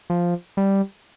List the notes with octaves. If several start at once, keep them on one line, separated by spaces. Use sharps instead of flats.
F3
G3